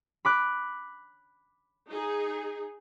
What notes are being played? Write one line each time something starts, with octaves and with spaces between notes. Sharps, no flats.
B5 D6 F#6
D#4 G#4